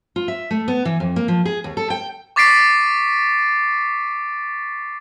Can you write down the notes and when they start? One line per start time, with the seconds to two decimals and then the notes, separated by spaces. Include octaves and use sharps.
0.16 F4
0.28 E5
0.51 A3
0.68 B3
0.85 E3
1.00 F2
1.16 A#3
1.28 F3
1.45 G#4
1.64 D#2
1.77 A4
1.90 G5
2.36 C#6 D6 A6 B6 C7 D7